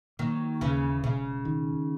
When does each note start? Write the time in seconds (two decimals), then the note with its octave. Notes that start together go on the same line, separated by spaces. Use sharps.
0.19 D#3 F#3 A#3
0.61 D#2 C#3 E3
1.03 E1 C#3
1.45 D#3